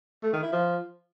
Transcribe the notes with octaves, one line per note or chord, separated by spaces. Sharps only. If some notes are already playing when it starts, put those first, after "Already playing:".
A3
D#3
E4
F3